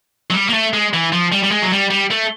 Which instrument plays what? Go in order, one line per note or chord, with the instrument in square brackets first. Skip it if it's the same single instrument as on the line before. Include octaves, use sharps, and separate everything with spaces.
[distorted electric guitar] F#3
G3
A#3
A3
G#3
E3
F3
G3
G3
G#3
F#3
G3
G3
A3